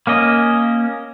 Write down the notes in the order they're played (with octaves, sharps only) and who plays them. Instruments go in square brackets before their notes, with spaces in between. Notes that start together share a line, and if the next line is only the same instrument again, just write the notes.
[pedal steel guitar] A#3 C#4 D#5